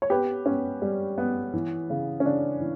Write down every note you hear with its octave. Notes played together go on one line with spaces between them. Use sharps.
C#5
B3 G4 B4
B3 C#4
G3
B3
E3
C#3
C#4
C#3 D4
E3